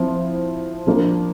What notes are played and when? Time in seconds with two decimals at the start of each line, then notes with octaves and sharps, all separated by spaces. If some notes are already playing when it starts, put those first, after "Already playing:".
Already playing: F3 C4 E4 C5
0.87 F3 A#3 D4